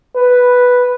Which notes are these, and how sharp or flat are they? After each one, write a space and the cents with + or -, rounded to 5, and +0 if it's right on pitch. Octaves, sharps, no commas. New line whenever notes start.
B4 +0